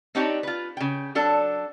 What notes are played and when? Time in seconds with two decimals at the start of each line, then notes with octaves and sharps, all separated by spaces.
0.15 C4 D4 D#4 G4 C#5
0.43 F4 B4
0.77 C#3 G5
1.15 F#3 D4 A4